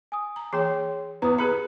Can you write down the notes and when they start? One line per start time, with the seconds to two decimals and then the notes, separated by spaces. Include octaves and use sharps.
0.12 G#5 D#6
0.36 A#5
0.53 E3 A#3 G#4 C#5 G5 C6
1.22 E2 B3 B4 A#5 D#6
1.38 G4 G#4 B4 B5 F#6 C#7